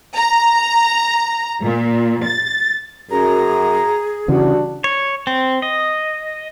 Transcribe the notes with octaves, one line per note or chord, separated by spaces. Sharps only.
A#5
A#2
A6
F#2 G#4 A#5
G2 C#3 E3 D4 F#4
C#5
C4
D#5